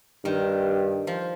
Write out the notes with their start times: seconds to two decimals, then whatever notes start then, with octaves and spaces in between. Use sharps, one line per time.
0.25 G2 D#3
1.07 F3